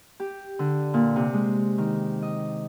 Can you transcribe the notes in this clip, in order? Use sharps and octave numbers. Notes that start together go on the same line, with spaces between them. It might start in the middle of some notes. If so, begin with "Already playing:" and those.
G4
D3
A#2
C3
G#3
D#3
D#5